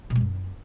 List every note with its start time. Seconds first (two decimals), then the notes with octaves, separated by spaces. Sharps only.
0.10 B2
0.15 G#3
0.21 F#2